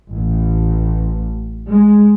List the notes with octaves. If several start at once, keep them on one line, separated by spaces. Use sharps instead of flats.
A1
G#3